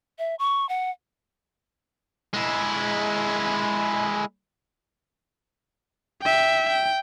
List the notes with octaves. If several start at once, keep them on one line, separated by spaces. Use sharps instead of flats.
E5
C#6
F#5
G#3 E4
E5 G5
G5